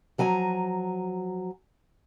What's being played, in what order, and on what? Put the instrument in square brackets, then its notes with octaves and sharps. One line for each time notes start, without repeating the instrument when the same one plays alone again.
[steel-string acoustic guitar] F3 F#3 G#5 A#5